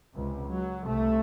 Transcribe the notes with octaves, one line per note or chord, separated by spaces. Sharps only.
C#2 C3
F#3
C2 C3 A3